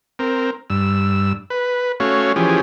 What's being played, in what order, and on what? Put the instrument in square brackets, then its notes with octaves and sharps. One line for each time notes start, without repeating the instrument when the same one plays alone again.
[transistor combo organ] C4 A#4
G2 E6
B4
A3 C#4 F#4 C#5 F5
E3 F3 C#4 G4 G#4